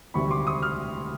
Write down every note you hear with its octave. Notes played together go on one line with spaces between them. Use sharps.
E1 D2 C3 D#3 G3 B5 C#6
C6 D6
C#6 D#6
D#6 F6